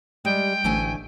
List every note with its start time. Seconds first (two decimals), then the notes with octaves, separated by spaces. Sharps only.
0.25 G3 G#3 G5
0.64 A1 D2 A3 G#5